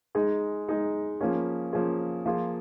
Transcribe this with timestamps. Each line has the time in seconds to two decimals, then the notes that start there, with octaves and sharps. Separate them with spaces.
0.15 G#3 D#4 G#4
0.68 G#3 D#4 G#4
1.21 F3 A#3 C#4 G#4
1.73 F3 A#3 C#4 G#4
2.26 F3 A#3 F4 G#4